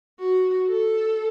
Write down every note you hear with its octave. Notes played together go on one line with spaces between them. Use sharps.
F#4
A4